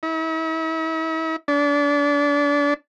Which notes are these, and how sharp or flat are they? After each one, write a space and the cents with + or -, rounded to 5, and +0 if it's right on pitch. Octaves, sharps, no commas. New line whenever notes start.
E4 -40
D4 -30